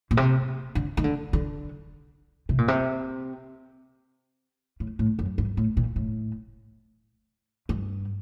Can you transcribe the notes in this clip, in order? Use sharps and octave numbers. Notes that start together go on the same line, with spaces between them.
A#2
C3
D3
D#3
D3
D3
C3
A#2
C3
A2
A2
F#2
G2
A2
A#2
A2
G2